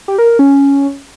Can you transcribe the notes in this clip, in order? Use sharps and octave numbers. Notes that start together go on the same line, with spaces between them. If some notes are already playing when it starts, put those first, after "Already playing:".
G4
A#4
A#4
C#4